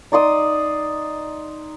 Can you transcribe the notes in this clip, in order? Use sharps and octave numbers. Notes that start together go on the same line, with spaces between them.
D#4 D5 C6 D#6